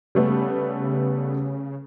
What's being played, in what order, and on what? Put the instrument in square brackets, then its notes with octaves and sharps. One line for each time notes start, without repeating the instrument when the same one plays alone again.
[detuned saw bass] C#3 [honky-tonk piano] G3 A3 B3